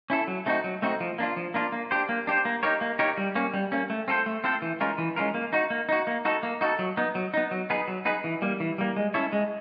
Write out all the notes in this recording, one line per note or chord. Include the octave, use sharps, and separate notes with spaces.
C#4 E4 A4
F#3
A3 C4 D#4 F#4
F#3
A3 C4 D#4 F#4
F3
A#3 D4 F4
F3
A#3 D4 F4
A#3
D4 G4 C5
A#3
D4 G4 C5
A#3
D#4 G4 A#4 C#5
A#3
D#4 G4 A#4 C#5
G3
A#3 C#4
G3
A#3 C#4
A3
C4 F4 A4 C5
A3
C4 F4 A4 C5
E3
G#3 C#4 F4 A#4
E3
G#3 C#4 F4 A#4
A#3
D#4 F#4
A#3
D#4 F#4
A#3
D#4 F#4 A4
A#3
D#4 F#4 A4
F#3
B3 D#4
F#3
B3 D#4
F#3
B3 D#4 G#4 B4
F#3
B3 D#4 G#4 B4
E3
G3 A#3
E3
G3 A#3
G#3
C#4 E4 A4 C#5
G#3